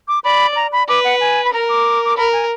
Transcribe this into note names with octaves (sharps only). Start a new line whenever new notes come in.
D6
D5 B5
A#5
B5
B4 D6
F#5
G#5
B5
A#4 A#5
D6
D6
A#4 B5
G#5